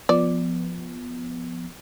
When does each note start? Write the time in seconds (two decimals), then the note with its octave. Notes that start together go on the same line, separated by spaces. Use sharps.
0.09 F3 B3 D5